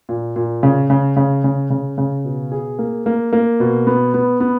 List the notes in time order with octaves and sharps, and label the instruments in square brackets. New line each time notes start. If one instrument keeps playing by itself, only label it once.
[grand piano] A#2
A#2
C#3
C#3
C#3
C#3
C#3
C#3
B2
G#4
A#3
A#3
A#3
B2
B3
B3
B3